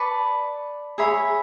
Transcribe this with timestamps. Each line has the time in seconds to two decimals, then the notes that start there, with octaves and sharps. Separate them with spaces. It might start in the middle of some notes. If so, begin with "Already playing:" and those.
Already playing: B4 D5 A5 C#6
0.98 G#4 C#5 E5 B5